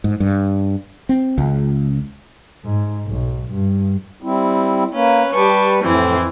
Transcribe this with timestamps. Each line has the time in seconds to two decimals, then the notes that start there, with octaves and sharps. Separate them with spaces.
0.04 G#2
0.20 G2
1.09 C4
1.38 C#2
2.65 G#2
3.06 B1
3.52 G2
4.22 G3 C4 E4
4.93 A#3 C#4 B4
5.33 G3 G4 B4 A5 C#6
5.81 F2 A2 E3 C4